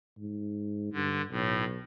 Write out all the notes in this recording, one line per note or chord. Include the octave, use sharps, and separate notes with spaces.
G#2
G2 D3
B1 A2